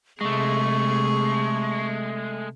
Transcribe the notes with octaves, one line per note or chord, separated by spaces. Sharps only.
C3 G#3 A3 G#4 C#6